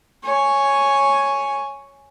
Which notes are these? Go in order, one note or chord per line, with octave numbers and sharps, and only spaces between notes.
C#5 G#5